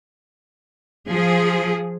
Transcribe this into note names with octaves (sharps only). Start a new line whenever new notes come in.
F3 G#4